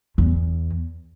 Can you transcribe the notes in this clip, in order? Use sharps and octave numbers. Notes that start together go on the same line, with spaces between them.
E2